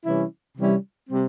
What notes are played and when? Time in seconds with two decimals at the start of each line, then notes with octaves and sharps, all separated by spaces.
0.05 C3 E3 G3 C#4 E4
0.56 C3 E3 G3 C#4 E4
1.08 C3 G3 C4